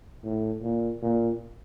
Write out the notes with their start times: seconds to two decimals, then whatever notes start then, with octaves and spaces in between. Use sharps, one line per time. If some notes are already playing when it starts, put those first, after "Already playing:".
0.24 A2
0.62 A#2
1.02 A#2